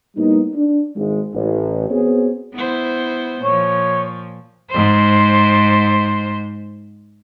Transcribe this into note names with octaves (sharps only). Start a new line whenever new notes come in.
A2 G3 A#3 B3 D#4
D4
G#1 G#3
A1
B3 C4 F#4 G#4 C5 C#5
B3 E4 C5
A#2 F3 C#5
G#2 C5